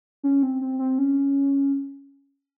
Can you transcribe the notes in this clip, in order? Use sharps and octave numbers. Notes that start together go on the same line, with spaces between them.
C#4
C4
C4
C4
C#4